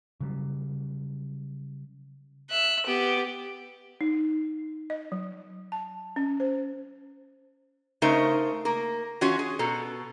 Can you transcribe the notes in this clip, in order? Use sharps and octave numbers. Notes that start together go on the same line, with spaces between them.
C#3 F#3 G3
E5 F#6
B3 G4
D#4
D#5
F#3
A5
C#4
C5
C#3 A3 D#4 A#4 C5
A#3 A#4
E3 C#4 F4 F#4
G#4
B2 A4 A#5